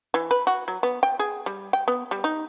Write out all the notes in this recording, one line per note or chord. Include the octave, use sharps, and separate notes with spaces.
E3
B4
F#4
F#3
B3
G5
G#4
G3
G5
B3
G3
D#4